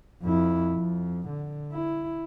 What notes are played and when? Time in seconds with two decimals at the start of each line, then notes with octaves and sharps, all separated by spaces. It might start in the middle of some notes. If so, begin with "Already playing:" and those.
0.22 F2 E4
0.73 F2
1.29 D3
1.72 E4